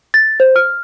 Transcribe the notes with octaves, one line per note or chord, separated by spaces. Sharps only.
A6
C5
F6